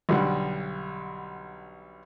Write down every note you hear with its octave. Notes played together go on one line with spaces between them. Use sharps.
B1 D3 G3 F#5